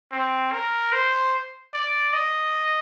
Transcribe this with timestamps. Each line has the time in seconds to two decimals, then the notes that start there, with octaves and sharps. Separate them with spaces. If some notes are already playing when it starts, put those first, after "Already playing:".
0.12 C4
0.53 A#4
0.93 C5
1.74 D5
2.13 D#5